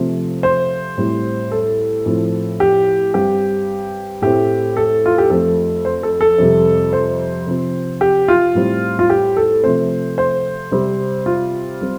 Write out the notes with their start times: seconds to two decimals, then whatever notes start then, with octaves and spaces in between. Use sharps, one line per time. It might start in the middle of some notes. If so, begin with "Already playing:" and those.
Already playing: C3 F3 A3 C4
0.43 C5
0.98 A2 G3 C4
1.51 A4
2.06 A2 F3 C4
2.60 G4
3.14 G2 G3 C4 G4
4.22 A2 A3 C4 G4
4.77 A4
5.06 F4
5.18 G4
5.30 F2 F3 A3 C4 A4
5.85 C5
6.03 A4
6.21 A4
6.38 F2 C3 G3
6.93 C5
7.47 C3 F3 C4
8.01 G4
8.28 F4
8.55 A2 G3 C4
8.99 F4
9.10 G4
9.37 A4
9.64 C3 F3 A3 C4 C5
10.18 C5
10.72 C3 G3 C4
11.26 F4
11.81 G3 C4